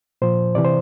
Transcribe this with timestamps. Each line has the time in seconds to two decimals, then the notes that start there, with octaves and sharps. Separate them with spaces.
0.22 A#2 F3 C5
0.55 C3 E3 D5
0.65 C5